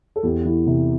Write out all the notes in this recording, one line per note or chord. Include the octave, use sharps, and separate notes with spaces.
A4
E2 G4
E3
C3